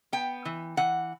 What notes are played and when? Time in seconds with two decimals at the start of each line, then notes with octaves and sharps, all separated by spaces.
0.13 B3 G5
0.45 E3
0.77 E3 F#5